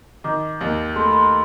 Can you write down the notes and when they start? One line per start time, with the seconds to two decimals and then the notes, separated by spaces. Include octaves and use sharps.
0.24 D#3 D6
0.61 D#2
0.96 A3 C6
1.05 B5
1.13 C6